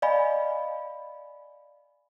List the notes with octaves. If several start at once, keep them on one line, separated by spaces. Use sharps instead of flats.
D5 D#5 F5 G#5 B5